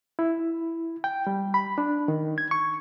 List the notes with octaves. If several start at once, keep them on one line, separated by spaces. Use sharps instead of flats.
E4
G5
G3
B5
D4
D#3
G#6
C#6